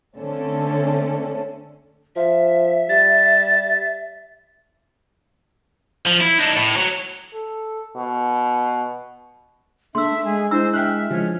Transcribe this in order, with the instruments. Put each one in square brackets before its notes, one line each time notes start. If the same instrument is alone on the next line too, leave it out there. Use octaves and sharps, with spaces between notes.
[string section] D3 A3 C4 C#4 A4
[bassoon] F3 [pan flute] E5
[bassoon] G3 [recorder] A6
[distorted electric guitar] F3
E4
D4 D#4
A2
F#3 C#5
[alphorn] A4
B2
[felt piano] A3 [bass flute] D4 [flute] E5 [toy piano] C6 E6
[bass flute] G#3 [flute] G#4
[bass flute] G#3 [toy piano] D4 E4 E6 [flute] C5
[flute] E5 [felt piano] G5 F6 F#6
[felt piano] F3 [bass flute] G#3 [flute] C#4